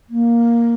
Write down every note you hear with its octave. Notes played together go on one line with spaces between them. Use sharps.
A#3